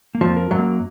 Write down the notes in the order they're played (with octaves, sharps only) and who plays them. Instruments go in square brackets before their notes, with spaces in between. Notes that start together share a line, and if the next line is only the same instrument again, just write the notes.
[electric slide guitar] A#3
[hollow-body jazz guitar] F2 F3
[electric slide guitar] A#4
[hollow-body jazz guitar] F#2 F#3
[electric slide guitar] A#3